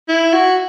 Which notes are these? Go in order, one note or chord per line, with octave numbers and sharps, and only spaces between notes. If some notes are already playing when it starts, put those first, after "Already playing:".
E4
F#4